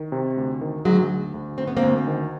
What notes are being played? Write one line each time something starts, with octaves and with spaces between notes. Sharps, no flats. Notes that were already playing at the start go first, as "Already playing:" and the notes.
Already playing: D#3
C3
D2
D#3
D2 F#3 G#3
D2
D2
D2 C4
B3
A#3 C4
D2
D#3